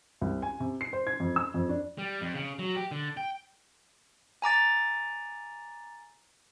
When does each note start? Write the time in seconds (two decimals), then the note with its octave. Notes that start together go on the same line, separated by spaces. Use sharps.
0.21 C2
0.42 G#5
0.60 C3
0.81 C7
0.93 C5
1.07 G#6
1.20 F2
1.36 E6
1.54 F2
1.69 D4
1.98 G3
2.21 F2
2.34 C#3
2.59 F#3
2.75 G4
2.91 D3
3.17 G5
4.42 G#5 A#5 D6 A6